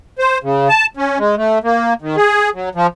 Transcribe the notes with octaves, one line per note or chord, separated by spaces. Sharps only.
C5
C#3
A5
C#4
G#3
A3
A#3
D#3
G#4
F#3
F3